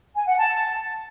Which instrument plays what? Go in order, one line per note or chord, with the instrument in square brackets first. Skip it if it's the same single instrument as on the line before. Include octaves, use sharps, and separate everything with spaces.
[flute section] G#5
F#5
A5